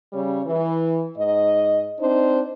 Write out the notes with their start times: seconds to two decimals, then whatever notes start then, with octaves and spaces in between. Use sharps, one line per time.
0.13 C#3 G3 C#5
0.47 E3
1.18 G#2 D#5
2.00 C4 D4 D#4 C5